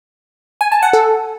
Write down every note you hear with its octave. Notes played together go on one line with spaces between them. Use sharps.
G#5
A5
F#5
A4